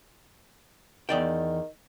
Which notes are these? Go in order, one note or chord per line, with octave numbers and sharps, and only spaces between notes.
E2 D#3 D5 G5